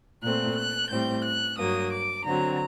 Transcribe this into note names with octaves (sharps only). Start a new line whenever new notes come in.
A#2 A3 C4 F#6
F#6
A2 G3 C4 G6
F#6
G2 F#3 A#3 D#6
D6
D3 F#3 C4 A#5